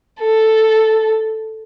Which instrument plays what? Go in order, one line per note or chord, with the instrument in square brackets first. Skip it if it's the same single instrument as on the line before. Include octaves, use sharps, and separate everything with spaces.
[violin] A4